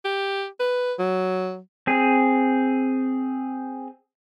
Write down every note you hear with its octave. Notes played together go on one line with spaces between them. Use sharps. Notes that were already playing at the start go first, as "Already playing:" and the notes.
G4
B4
F#3
C4 G#4